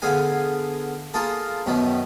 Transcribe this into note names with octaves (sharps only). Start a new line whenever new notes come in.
D3 B3 G#4 F5 G#5
A#3 F4 G#4 A4
F#2 B2 D#3 B3